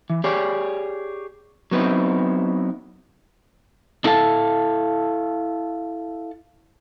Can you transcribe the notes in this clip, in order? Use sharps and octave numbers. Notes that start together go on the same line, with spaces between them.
E3
G4 G#4 C#5 D5
F#3 B3 C4 D#4 E4
D4 E4 A4 F5 A5